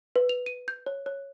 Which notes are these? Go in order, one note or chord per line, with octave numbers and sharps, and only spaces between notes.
B4
F7
D#7
G6
C#5
C#5